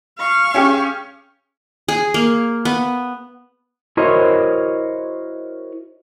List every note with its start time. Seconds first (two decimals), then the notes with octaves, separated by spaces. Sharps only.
0.19 F5 C#6
0.54 C#4 G4 G#4
1.88 G#4
2.14 A#3
2.65 B3
3.97 E4 F#4 A#4 C5 C#5 D#5